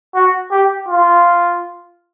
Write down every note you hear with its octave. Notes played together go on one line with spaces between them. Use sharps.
F#4
G4
F4